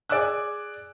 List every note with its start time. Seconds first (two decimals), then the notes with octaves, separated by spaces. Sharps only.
0.09 G#4 D5 G#5 D6 E6 F#6